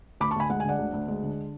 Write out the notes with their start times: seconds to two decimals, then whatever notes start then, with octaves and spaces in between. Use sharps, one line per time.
0.20 D2 B5 D6
0.31 A5 C#6
0.36 D2 G#5 B5
0.50 G#3 F#5
0.60 G#5
0.65 D3 D5 F#5
0.79 D2
0.93 D2
1.08 G#3
1.23 D3